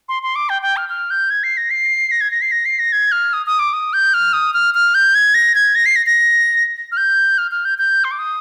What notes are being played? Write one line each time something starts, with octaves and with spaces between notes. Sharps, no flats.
C6
C6
D6
G5
G5
F6
F6
G6
G#6
C7
A#6
C7
A#6
G#6
A#6
C7
A#6
C7
A#6
G#6
F6
D#6
D#6
D6
D#6
G6
F6
D#6
F6
F6
G6
G#6
A#6
G#6
A#6
C7
A#6
A#6
F6
G6
F6
F6
G6
G6
C6
D6
D#6